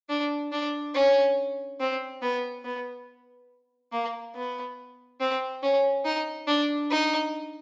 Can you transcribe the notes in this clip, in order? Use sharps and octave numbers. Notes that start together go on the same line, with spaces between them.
D4
D4
C#4
C4
B3
B3
A#3
B3
C4
C#4
D#4
D4
D#4